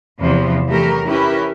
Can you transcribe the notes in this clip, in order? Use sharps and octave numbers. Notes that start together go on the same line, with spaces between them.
E2 C3 E3 F3
E3 F#3 A3 G4 A#4
C#4 E4 G4 A#4 B4